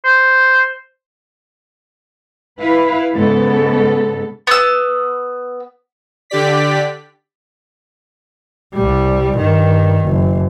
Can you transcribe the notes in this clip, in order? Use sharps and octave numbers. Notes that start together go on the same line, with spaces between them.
C5
E4 B4 F5
G#2 C#3 B3 A4
B3 E6
D3 G4 D5 B6
C2 G3
G2 D#3
F#1